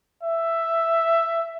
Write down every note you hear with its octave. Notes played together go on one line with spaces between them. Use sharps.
E5